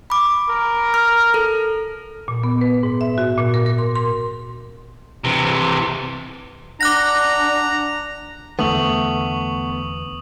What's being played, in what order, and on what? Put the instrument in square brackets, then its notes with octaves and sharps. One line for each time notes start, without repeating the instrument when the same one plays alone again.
[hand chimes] B5 D6
[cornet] A#4
[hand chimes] F6
A4
[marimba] A#2
B3
B4
G#2
E5
F#4
A#2
A#4
A#4
C6
C6
[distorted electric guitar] C3 E3
[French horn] D4 [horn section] F#5 A#5 [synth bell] D6 F#6 A#6
[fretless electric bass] E2 D3 [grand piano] A3 [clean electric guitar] B3 [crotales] C#6 D#6 F#7